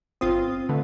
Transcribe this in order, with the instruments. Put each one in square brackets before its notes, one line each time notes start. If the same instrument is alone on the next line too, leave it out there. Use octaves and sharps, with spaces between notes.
[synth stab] G1 F4 D#6 [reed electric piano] C4
[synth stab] D3 [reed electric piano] A3 A4 B4